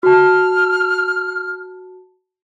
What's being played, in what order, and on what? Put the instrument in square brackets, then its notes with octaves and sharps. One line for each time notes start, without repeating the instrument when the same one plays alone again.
[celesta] F#4 A5 [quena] F6